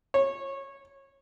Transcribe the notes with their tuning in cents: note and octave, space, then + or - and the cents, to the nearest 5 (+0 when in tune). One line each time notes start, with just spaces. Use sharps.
C#5 -20